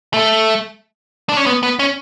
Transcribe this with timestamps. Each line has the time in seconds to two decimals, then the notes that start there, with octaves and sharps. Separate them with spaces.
0.14 A3
1.29 D4
1.37 C#4
1.46 B3
1.63 B3
1.79 C#4